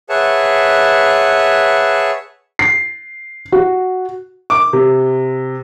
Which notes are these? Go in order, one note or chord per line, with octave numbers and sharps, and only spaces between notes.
G#4 B4 C#5 E5 F#5 A5
C7
F#4
D6
C3